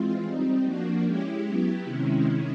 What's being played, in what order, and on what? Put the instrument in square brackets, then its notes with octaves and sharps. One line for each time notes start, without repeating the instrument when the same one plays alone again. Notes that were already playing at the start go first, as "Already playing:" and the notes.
Already playing: [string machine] E3 G#3 C4 F4
G3 C4 D#4
F3 A#3 D4 F#4
G#3 C#4 E4 G4
F#3 B3 E4 G4
C3 D#3 G#3 C#4 E4